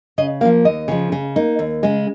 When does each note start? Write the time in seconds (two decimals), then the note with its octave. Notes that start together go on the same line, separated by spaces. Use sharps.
0.18 C#3 D#5
0.41 A#3 F5
0.45 F3
0.65 D#2 D#5
0.88 C#3 F3
1.12 C#3
1.36 A#3 D#4
1.59 D#2
1.83 C#3 G#3